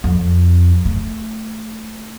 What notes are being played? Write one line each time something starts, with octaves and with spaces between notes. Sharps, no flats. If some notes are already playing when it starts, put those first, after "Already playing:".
F2
A3